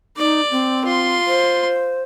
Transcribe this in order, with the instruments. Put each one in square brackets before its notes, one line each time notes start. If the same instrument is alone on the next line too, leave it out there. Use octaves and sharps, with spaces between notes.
[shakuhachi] D#4 [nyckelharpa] D5
[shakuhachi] C4
[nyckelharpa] F4 C6
[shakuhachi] C5